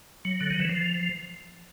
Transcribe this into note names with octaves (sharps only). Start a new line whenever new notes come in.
F#3
D3
D#3
E3
F3